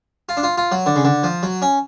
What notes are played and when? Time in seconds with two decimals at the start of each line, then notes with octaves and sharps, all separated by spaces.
0.29 F4
0.37 D4
0.43 F4
0.58 F4
0.72 F#3
0.86 D3
0.96 C#3
1.05 D3
1.23 F3
1.43 F#3
1.62 C#4